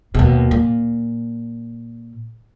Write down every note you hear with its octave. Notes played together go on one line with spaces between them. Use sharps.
D#2 B2
A#2